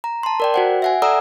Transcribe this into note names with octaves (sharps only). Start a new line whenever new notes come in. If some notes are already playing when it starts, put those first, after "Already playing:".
A#5
A5 C6
A#4 D5 G5
F#4 C5 F#5
E5 F#5 G#5
A4 D5 F#5 A#5 D#6 E6